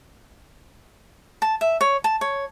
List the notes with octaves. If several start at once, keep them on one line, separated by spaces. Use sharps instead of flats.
A5
E5
C#5
A5
C#5